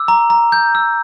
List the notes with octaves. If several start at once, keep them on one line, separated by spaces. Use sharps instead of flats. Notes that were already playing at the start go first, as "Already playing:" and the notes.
Already playing: D6 E6
A#5
A#5
G6
E6